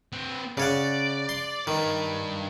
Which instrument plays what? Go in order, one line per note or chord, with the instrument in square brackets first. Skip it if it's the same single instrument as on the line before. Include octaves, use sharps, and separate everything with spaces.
[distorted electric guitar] C4 B4
[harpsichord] C#3 C#5 F#5 [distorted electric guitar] D5
[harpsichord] C6
[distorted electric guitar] G2 B4 [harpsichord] D#3